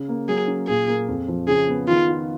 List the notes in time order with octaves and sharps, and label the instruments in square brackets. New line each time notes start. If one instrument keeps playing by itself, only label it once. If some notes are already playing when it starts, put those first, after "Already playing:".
Already playing: [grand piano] C#3
A#3
[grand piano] F#3 [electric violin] G#4
[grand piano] C#4
[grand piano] A#2 [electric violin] G#4
[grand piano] A#3
F2
F3
[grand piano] C#3 [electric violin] G#4
[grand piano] B3
[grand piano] D#3 [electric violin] F4
[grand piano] F4